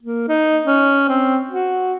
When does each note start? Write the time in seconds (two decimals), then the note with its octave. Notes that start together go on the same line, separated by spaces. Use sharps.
0.03 A#3
0.28 D#4
0.65 C#4
1.09 C4
1.49 F#4